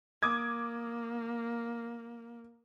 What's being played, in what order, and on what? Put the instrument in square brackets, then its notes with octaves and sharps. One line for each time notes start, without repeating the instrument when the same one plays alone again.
[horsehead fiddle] A#3 [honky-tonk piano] D6 D#6 G#6